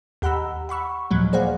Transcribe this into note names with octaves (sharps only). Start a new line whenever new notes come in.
D#2 G4 F#5 A#5 B5 E6
F#5 B5 C#6 E6
D#2 A#2 F3 F#3 G#3
A#3 G#4 C5 D5 F5 F#5